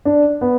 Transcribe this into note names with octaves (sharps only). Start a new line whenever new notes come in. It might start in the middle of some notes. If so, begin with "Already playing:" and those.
D4
B3